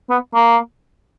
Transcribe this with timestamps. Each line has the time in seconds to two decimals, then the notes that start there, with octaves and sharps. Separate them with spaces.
0.10 B3
0.34 A#3